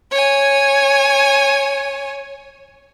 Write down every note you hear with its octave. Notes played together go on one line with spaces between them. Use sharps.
C#5 G#5